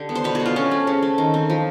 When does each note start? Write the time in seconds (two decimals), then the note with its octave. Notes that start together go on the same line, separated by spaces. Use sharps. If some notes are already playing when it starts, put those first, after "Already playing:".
Already playing: D3 G4
0.09 B3
0.15 C5
0.24 B2 B4
0.35 B3 F#4
0.46 F4
0.56 C4 C#4
0.71 A3
0.87 C#3
1.02 A3
1.18 D#3
1.34 C4
1.50 F3